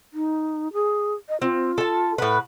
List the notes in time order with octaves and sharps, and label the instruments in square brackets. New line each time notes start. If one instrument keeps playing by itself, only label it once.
[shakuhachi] D#4
G#4
D#5
[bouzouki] C4 [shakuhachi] F4
[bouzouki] A4 A5
[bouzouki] A2 B4 [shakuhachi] F#5